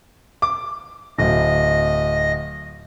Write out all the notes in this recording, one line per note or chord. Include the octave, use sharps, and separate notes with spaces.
D6
D1 D#5